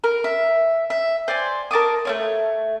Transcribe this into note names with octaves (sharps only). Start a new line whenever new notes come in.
A#4
E5
E5
C5 D5 G#5
A#4 A5 D6 D#6
A3 C#4 C#5